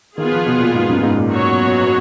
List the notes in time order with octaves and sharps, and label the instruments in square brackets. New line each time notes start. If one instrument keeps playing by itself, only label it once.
[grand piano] D#3 [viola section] B3 F4 G#4
[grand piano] F3
B2
A#2
G#2
F#2
G#2
A#2
[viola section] F#3 B3 F#4 C#5